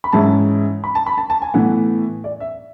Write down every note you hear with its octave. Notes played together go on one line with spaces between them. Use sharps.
B5
G#2 E3 G#3 C#4 E4 A5
B5
A5
B5
A5
A5
G#5
A2 E3 B3 F#5
D5
E5